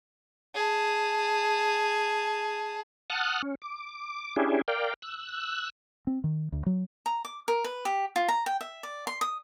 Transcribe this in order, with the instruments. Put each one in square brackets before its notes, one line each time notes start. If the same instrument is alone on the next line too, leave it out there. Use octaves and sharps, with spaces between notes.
[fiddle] G#4 A5
[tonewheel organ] F#5 A5 D#6 F6 F#6
C#4
D6
C#4 D4 E4 G4 G#4
A#4 D5 F5 G5
E6 F#6
[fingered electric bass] C4
D#3
D2
F#3
[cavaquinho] A#5
D6
A#4
B4
G4
F4
A#5
G5
E5
D5
C6
D#6